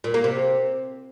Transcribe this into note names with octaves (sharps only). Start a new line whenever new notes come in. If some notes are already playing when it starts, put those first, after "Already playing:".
A#2
A#3
C3